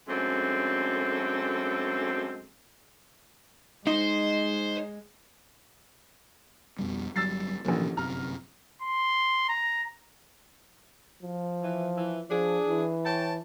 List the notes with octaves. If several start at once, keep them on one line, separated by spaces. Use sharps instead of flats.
F#2 G#3 A3 C4 D4 A4
G#3 D#4 C5
F2 B2 G3
G1 F#3 G3 E6 A6 C7
A1 B2 D3 F3 F#3 A#3
G1 F#2 C3 A#5 F6
C6
A#5
F3
E3
E3
F3 D4 G#4
E3
C#5 G5 A5